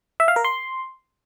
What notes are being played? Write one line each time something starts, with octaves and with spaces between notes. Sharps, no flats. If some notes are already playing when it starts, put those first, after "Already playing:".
E5
F5
A#4
C6